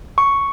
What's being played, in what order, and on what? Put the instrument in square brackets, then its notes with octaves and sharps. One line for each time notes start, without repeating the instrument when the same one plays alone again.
[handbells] C#6